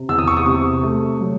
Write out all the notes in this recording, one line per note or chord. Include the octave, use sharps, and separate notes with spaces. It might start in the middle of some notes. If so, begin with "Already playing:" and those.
Already playing: C3
E2 E6
D#6
C#6
D#6
C3 C#6
A3
F#3